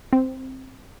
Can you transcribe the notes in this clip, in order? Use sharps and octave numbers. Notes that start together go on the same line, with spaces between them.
C4